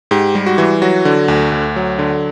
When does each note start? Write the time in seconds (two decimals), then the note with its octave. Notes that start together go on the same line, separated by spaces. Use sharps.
0.11 G#2 G4
0.35 G3
0.46 F#4
0.58 E3
0.82 F#3 F#4
1.05 D3
1.28 D2
1.52 D2
1.76 F#3
1.99 D3